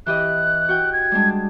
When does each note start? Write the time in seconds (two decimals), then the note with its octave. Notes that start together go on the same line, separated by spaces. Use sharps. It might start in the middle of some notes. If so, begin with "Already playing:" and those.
0.06 E3 G4 D#5 F#6
0.69 F#4 G5
0.93 G#6
1.12 G3 G#3 D4